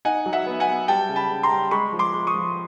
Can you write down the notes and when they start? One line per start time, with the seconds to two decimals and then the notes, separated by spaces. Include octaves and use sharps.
0.05 D#4 F#5 G#5
0.26 F#3
0.33 E5 F#5
0.46 B3
0.60 F#5 G#5
0.68 B3
0.88 G3 G5 A5
1.09 C#3
1.16 A5 B5
1.31 C#3
1.43 A#5 C6
1.51 G3
1.71 G#3 B5 C#6
1.93 F3
1.99 C6 D6
2.13 G#3
2.27 C#6 D#6
2.34 F3